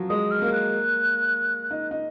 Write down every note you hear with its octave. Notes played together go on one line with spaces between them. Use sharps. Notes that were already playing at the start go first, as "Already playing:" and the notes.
Already playing: F3 F#3
G#3 D#6
F6
A#3
F#6
D#4
D#4